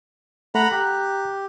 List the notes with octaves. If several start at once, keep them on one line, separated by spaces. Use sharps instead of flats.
A3 F#5 A#5 B5
G4 A#5 F#6